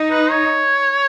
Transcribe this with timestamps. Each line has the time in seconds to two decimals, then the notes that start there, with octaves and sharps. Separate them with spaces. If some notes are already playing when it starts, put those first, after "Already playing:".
Already playing: D#4
0.11 B4
0.31 C#5